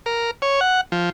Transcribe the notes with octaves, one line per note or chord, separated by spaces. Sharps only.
A#4
C#5
F#5
F3